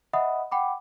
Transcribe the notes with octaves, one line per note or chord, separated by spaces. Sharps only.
D#5 E5 F#5 B5 D#6
F#5 G5 B5 D6